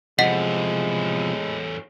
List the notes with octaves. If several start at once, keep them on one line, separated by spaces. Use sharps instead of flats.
E2 A2 C3 F3 G#3 D#5 F#5 B6